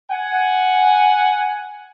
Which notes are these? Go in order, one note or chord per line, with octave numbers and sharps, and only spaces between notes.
F#5 G#5